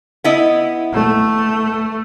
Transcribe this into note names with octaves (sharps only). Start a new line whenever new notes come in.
B3 E4 D#5
A3